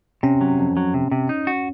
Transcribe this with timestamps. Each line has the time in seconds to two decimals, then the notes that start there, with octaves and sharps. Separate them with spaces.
0.23 C3 C#4
0.41 F#3
0.59 F2
0.77 F#3
0.94 C3
1.11 C3
1.29 D#4
1.47 F#4